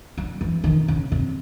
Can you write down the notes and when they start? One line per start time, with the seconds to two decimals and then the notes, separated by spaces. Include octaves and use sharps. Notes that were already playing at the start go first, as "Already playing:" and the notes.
0.18 G3
0.41 E3
0.64 D#3
0.88 C#3
1.12 C3